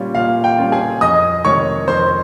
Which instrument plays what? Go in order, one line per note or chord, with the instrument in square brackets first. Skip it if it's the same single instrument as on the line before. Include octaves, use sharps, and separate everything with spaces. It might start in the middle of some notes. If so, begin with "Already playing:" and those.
Already playing: [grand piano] A#2 G3 C#4 F4
A#2 F5
G5
G3 C#4 F4
G#4 G#5
F2 D#5 D#6
C3 D#3 G#3 C#5 C#6
F2 C5 C6